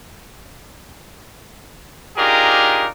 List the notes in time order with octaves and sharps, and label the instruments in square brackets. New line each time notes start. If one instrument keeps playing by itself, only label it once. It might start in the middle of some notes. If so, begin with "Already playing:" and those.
[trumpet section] D4 D#4 F4 G4 G#4 A#4